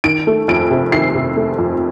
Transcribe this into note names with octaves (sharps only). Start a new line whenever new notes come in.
D#3 D7
A3
F2 D7
C3
D#3 C7
C3
A3
F2